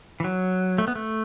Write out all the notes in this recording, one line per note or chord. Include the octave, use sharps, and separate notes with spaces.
E3
F#3
A3
B3
A3